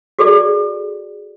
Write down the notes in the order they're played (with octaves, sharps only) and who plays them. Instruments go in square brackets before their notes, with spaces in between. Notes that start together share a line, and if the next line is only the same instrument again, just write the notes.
[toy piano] F#4 G#4 A4 D5